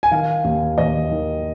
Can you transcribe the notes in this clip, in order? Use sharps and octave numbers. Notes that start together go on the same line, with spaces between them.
G#5
D#3 F5
D#2
D#2 D#5
D#3